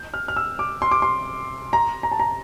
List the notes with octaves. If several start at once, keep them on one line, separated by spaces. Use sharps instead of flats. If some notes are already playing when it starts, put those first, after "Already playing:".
Already playing: G6
F6
F6
E6
D6
C6
D6
C6
A#5
A#5
A5
A#5